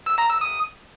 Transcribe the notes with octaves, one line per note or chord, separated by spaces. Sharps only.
E6
A#5
E6
D#6